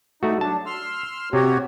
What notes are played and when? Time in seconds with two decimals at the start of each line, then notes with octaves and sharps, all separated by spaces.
0.23 A3 D#4 F#4
0.41 F#3 D4 A5
0.66 C6 E6 F6
1.33 C3 F#4 G4 C#5